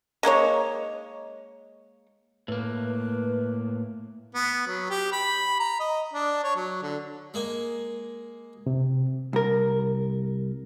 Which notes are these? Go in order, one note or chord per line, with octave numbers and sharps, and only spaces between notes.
G#3 A#3 D#4 C#5
A2 A#3 B4
B3
F#3
G4
B5
A#5
D#5
D4
C#5
F#3
D3
G#3 A#3 G#5
C3
C2 A#4